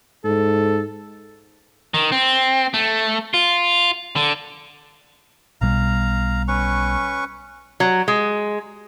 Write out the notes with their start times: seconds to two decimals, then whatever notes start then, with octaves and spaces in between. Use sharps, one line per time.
0.24 G#2 A4
1.94 D#3
2.12 C4
2.74 A3
3.34 F4
4.16 D3
5.61 B1 B2 G3 F5 A#5
6.48 C#4 B4 C#6
7.80 F#3
8.08 G#3